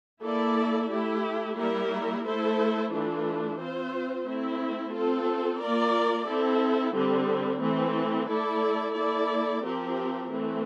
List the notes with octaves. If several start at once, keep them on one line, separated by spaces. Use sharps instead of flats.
A#3 E4 A4 D5
A3 E4 G4
G3 A#3 E4 A#4
A3 E4 A4 C5
E3 A3 D4 F4
C4 F4 C5
A3 C4 E4
C4 F4 A4
A#3 F4 A#4 D5
C4 E4 A4
D3 G3 C4
E3 A3 C4
A3 E4 A4 D5
A#3 E4 A4 D5
F3 C4 G4 A#4
E3 A3 C4